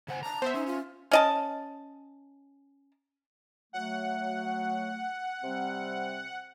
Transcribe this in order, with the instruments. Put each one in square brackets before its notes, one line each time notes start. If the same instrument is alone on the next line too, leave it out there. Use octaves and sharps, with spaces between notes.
[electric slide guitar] C#3 F#5 G#5 [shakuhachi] C5
[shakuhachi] A5 [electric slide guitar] A#5
[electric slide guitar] B3 [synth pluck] C5 E5
[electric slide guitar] C#4 [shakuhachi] D#4
[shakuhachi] F4
[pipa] C#4 D#5 A5
[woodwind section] F#3 A3 [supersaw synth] F#5
[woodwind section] C3 G3 C4